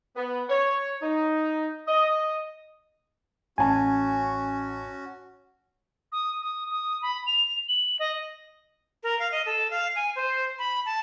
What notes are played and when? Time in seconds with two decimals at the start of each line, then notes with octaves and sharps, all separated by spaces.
0.16 B3
0.49 C#5
1.02 D#4
1.88 D#5
3.58 A1 C#4 F#4 G#5 A5
6.12 D#6
6.42 D#6
6.71 D#6
7.02 B5
7.27 F7
7.68 F#7
7.99 D#5
9.03 A#4
9.19 F5
9.32 D#5
9.46 A4
9.71 F5
9.96 G#5
10.16 C5
10.59 B5
10.86 A5